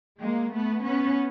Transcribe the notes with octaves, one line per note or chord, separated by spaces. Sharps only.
G#3 A#3
A3 B3
B3 C#4